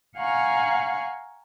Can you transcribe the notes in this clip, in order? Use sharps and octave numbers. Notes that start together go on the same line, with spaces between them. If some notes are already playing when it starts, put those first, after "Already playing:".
F5 F#5 G#5 A#5 C#6